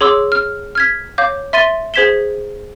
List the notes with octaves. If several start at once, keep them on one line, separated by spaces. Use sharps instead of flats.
G#4 C#5 C6 D6 E6
F6
F6 G#6 B6
C#5 F5 D6 G6
E5 C6 A6 D#7 G7
G#4 C5 G#6 B6 E7 G7